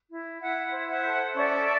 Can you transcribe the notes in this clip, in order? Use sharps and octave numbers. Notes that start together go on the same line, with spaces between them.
E4
E4 E5 F#5
C5
E5 F#5
A4
C#4 D5 E5